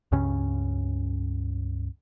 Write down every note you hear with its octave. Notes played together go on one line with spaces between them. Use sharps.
C#2 G2 C#3 C#4